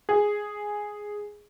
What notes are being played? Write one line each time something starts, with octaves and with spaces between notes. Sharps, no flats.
G#4